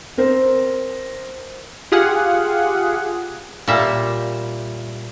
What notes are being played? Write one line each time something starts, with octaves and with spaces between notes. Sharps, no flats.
C4 A#4 C5
F4 G4 G#4 F5 F#5 G#5
A#2 G3 E5